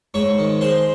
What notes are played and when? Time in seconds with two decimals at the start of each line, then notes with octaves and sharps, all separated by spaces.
0.14 G#2 C#5 C#6
0.38 D#3
0.61 G#3 C5 C6